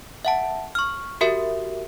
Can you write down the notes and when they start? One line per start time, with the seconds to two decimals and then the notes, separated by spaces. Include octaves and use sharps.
0.25 E5 F#5 A5
0.75 C#6 F6
1.21 F#4 G4 A#4 E5